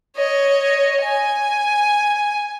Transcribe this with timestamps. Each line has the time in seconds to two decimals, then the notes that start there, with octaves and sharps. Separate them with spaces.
0.16 C#5 D#5
1.01 G#5